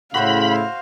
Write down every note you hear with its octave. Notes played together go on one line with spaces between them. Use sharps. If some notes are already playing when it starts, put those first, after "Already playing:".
A2 C#3 E4 F#4 C5 F5 B5